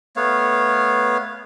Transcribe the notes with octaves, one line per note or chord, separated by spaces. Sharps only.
A3 B3 C#5 F5